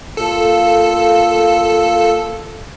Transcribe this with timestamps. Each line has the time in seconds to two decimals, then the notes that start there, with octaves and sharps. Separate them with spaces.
0.17 A#3 F4 A4